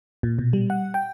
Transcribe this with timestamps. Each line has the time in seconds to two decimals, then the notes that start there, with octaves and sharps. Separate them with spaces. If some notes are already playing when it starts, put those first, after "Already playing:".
0.23 A#2
0.39 B2
0.53 G3
0.70 F#5
0.94 G5